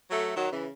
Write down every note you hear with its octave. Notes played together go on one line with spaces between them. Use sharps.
F#3 A3
D#3 F#3
C#3 E3